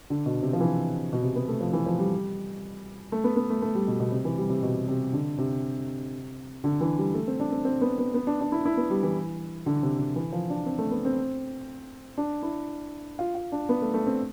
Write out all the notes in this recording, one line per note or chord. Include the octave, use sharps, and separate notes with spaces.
D3
B2
C3
F3
E3
B2
C3
B3
A3
F3
E3
F3
G3
A3
B3
B3
A3
A3
G3
B2
B2
C3
E3
G3
C3
B2
C3
D3
C3
D3
E3
G3
A3
C4
D4
C4
C4
B3
B3
B3
D4
D4
E4
E4
B3
G3
E3
D3
C3
C3
E3
F3
D4
C4
A3
B3
C4
D4
E4
F4
F4
D4
B3
A3
A3
C4